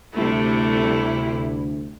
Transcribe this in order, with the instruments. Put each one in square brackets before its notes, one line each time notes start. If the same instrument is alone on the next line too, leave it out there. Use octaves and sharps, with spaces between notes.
[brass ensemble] D2 [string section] C3 G3 [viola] A3 [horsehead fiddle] E4